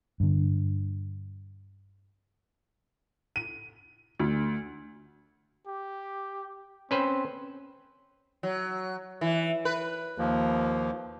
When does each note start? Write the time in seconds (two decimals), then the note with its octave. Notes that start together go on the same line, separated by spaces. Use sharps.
0.20 G2 D3
3.36 D#7
4.19 D2
5.67 G4
6.91 C4 C#4 B4 C5
8.43 F#3
9.21 E3
9.65 B4
10.18 D#2 F3 A#3